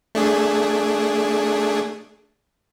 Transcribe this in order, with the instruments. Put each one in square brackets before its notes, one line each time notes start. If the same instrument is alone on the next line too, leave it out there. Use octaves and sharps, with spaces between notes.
[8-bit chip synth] A3 D4 G#4